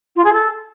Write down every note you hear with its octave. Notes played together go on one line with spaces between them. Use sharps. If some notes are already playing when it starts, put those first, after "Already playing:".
F4
G#4
A4